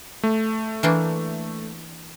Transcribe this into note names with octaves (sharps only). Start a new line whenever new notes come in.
A3
E3 A#3 D4